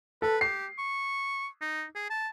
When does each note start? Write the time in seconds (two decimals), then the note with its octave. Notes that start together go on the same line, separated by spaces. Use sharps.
0.22 A4 B4
0.41 G4 C7
0.78 C#6
1.61 D#4
1.95 G#4
2.10 A5